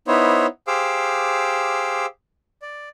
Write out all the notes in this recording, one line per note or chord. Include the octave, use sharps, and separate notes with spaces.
B3 D#4 E4 C5 C#5
G4 G#4 C5 F5 D6 E6
D5